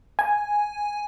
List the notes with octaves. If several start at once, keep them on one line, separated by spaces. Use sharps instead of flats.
G#5